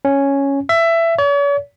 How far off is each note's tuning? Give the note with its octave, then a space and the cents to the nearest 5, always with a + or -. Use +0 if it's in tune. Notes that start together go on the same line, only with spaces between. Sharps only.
C#4 +0
E5 +15
C#5 +45